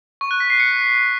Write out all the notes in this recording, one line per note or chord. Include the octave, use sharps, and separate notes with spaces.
C#6
F#6
B6
C7
C#7